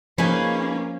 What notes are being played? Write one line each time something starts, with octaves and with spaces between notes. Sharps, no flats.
F3 A#3 C#4 D#4 G#4 B4